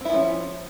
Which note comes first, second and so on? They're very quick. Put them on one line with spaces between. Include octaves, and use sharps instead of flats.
C4 E4 F3 C#4